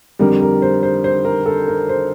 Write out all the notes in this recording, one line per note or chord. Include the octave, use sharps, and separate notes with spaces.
F2 D3 G3 A#4
A#4
C5
C5
C5
A#4
A4
A#4
C5